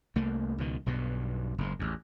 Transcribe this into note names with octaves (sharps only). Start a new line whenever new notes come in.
C2 A3 A#3
C#2 B2 D#3
B1 G2 B2
F#1 G#2
A1 E2